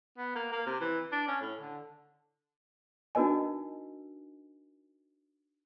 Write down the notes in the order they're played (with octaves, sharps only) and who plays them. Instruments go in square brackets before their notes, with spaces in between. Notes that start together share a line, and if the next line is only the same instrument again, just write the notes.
[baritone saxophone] B3
A#3
A#3
C3
E3
D4
C#4
A2
D3
[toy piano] D4 D#4 F#4 A#4 D#5 G#5